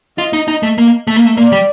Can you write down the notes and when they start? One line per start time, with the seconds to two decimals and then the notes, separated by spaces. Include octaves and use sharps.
0.18 F4 D#5
0.33 D#4
0.48 D#4
0.63 A3
0.78 A#3
1.07 A3
1.16 A#3
1.25 A3
1.37 A#3 D5
1.52 G3